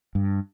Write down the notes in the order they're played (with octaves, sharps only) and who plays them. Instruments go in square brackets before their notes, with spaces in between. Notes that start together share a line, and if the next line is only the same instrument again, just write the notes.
[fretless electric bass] G2